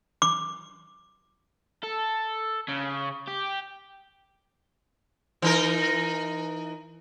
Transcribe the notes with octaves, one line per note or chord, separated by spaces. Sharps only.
D6
A4
C#3
G4
E3 D#4 A#4